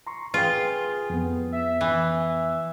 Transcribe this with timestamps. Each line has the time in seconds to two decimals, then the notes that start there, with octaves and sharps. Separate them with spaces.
0.07 A#5 C6 C#6
0.34 F4 G#4 B4 G5
1.10 F2 B3
1.52 E5
1.81 E3